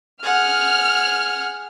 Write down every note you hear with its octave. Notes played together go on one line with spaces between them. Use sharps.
G#4 F#5 F6